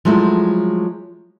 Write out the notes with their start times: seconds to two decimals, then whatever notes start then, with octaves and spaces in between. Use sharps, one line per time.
0.05 F3 F#3 G#3 A3 E4